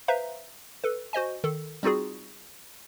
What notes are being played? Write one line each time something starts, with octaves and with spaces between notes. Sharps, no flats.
B4 C5 E5 F5 A#5
A4 B4
F#4 C5 D#5 G#5
D#3 A4
G3 C4 D#4 F4 F#4 G#4